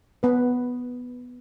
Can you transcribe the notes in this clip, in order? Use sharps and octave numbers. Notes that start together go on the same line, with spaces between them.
B3 B4